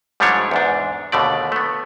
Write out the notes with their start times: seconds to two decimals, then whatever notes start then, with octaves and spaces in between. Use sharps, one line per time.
0.20 G#2 F3 G3 A3 D4 C#5
0.51 E2 G#2 D4
1.12 D#2 B2 D3 A3 D5
1.52 A3 B3